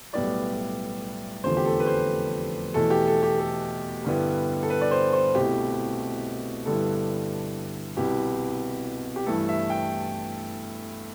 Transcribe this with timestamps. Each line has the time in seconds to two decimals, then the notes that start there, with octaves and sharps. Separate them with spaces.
0.13 B1 A2 G3 B3 E4 D5
1.44 F1 E2 D3 F3 A3 C5
1.57 G4
1.66 A4
1.80 B4
1.87 C5
2.74 E2 B2 A3 E4 A4
2.91 G4
3.08 A4
3.23 G4
3.39 A4
4.05 G2 D3 G3 B3 E4
4.63 A4
4.70 B4
4.81 D5
4.91 C5
5.13 C5
5.35 C2 B2 A3 E4 G4
6.66 G2 D3 G3 B3 E4 A4
7.97 C2 B2 B3 E4 G4
9.16 G4
9.27 G2 E3 A3 E4 A4
9.49 E5
9.70 G5